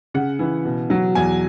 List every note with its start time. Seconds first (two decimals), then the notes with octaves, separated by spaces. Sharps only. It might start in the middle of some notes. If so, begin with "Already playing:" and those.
0.14 C#3 F#5
0.39 E3
0.65 B2
0.90 F#3
1.15 E2 G#5